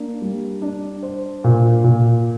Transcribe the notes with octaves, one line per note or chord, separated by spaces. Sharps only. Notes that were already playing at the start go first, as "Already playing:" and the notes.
Already playing: A#3 D4
G3
D4
C5
A#2
A#2